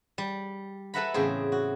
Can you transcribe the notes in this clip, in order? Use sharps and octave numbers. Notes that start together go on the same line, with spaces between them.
G3
A4 B4 E5 F#5 A#5 B5
E2 A2 C#3 C4 G#4 C5
F#4